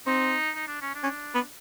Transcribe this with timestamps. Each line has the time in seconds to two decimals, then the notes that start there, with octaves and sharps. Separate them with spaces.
0.06 C4 D#4
0.55 D#4
0.68 D4
0.82 C#4
0.95 D4
1.03 C#4
1.35 B3